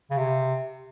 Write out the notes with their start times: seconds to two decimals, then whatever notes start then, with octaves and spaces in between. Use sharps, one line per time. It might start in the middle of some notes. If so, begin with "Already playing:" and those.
0.11 C#3
0.17 C3